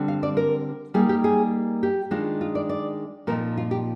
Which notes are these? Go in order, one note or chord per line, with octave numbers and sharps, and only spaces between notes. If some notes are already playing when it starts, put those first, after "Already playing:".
Already playing: D3 G3 C4
F5
D5
A#4
G3 A#3 D#4 G#4
G4
G#4
G4
D#3 G#3 D4 F4
F4
D5
D5
A#2 F3 C4 D#4 A#4
F4
G4